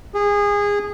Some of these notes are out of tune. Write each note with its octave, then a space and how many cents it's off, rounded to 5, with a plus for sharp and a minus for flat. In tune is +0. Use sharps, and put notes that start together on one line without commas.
G#4 -25